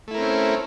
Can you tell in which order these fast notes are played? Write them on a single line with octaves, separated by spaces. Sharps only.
A3 E4 A#4 C4 C#4